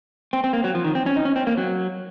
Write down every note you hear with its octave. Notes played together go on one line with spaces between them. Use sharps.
C4
C4
A#3
F#3
F3
D#3
C4
C#4
D#4
C#4
C4
A#3
F#3